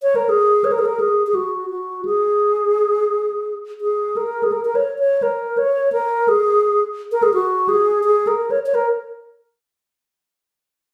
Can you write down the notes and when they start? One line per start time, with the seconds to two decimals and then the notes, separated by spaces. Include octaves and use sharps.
0.03 C#5
0.16 A#4
0.29 G#4
0.64 C#5
0.72 A#4
0.79 G#4
0.85 A#4
1.00 G#4
1.27 G#4
1.35 F#4
1.70 F#4
2.05 G#4
3.81 G#4
4.17 A#4
4.43 G#4
4.52 A#4
4.65 A#4
4.75 C#5
4.99 C#5
5.23 A#4
5.58 C#5
5.92 A#4
6.28 G#4
7.12 A#4
7.23 G#4
7.34 F#4
7.69 G#4
8.04 G#4
8.27 A#4
8.51 C#5
8.66 C#5
8.74 A#4